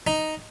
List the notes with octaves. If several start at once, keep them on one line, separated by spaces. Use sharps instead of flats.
D#4